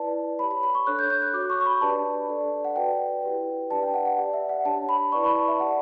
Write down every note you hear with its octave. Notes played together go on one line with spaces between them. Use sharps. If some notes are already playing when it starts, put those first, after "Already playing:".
Already playing: E4 B4 D5 A5
G4 C#5 B5
B5
B5
C#6
D4 A4 C#5 F#6
G6
G6
F#6
F#4 C#5 D6
C#6
C#6
B5
D4 G4 B4 D5 A5
D4 A4 D5
F#5
F#4 B4 D5 G5
E4 G4 B4
D4 G4 B4 D5 A5
G5
F#5
F#5
G4 D5
E5
F#5
D4 G4 C#5 A5
B5
E4 B4 D5 C#6
B5
A5
E5
G4 D5 F#5